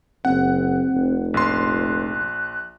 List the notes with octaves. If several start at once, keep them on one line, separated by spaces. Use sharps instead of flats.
F#1 C4 F#5
F1
A#1 C6 F#6